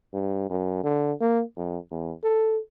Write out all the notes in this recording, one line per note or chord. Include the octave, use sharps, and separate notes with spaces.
G2
F#2
D3
A#3
F2
E2
A4